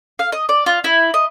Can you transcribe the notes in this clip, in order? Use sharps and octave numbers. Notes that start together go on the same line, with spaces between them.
F5
D#5
D5
F4
E4
D#5